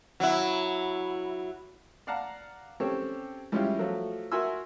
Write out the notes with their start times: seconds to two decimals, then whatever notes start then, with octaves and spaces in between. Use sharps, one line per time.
0.20 F#3 E4
2.07 D5 F5 F#5 A5 A#5
2.80 C4 C#4 G4 A4 C#5
3.52 G3 G#3 C#4 E4 F4 G4
3.79 F3 F#3 A3
4.32 F#4 A#4 E5 G#5 C6 E6